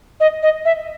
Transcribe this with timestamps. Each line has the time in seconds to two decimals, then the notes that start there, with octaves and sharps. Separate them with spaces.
0.20 D#5
0.43 D#5
0.65 E5